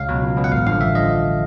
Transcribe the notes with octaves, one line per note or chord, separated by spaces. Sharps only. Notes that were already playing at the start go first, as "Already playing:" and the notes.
Already playing: C#2 F5
B2 F#3
C#2
B2 F#3
F#5
A1 F5
G2 D3 F3 F5
A1 E5
D3 F3 D#5